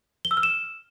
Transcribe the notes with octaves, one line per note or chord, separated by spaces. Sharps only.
G7
E6
F6
E7